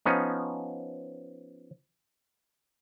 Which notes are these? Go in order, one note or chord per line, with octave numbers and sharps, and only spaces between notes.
F3 B3 C#4 D#4